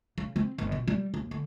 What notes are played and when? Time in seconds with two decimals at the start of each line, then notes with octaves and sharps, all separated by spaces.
0.18 C#3
0.36 C4
0.58 G1
0.72 B2
0.88 G3
1.14 D#2
1.31 D3